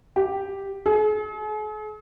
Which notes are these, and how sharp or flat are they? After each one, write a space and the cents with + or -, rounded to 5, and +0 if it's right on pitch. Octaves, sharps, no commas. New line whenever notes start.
G4 +0
G#4 +45